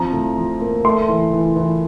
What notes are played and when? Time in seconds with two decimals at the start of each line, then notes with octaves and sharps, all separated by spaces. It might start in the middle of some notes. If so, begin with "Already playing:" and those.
Already playing: F3 C4 A#5
0.13 A2
0.37 F3
0.61 A#3
0.84 A3 C6
1.08 E3
1.33 E3
1.56 E3